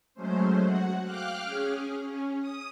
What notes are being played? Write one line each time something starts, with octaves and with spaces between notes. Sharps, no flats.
F#3 G#3 A3 C#4 C5
F#4 F#5
F5 G5 D6 F6 F#6
C#4 G#4
C#4
D#6